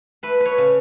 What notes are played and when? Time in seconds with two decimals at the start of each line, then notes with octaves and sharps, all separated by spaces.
0.23 A3 B4
0.41 B4 C#5
0.58 C#3